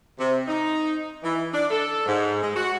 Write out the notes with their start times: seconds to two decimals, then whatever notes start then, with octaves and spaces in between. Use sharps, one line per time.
0.18 C3
0.48 D#4
1.24 E3
1.53 D4
1.71 A4
2.06 G#2
2.41 G#3
2.55 F#4